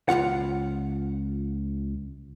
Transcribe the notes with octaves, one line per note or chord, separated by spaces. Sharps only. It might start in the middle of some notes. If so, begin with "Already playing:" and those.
C#2 F3 F4 F#5